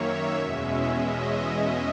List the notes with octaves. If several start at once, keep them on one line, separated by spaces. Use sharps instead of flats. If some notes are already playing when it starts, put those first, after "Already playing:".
Already playing: F#2 D#3 A#3 C#5 E5
E2 B2 G#3 C#4
D#5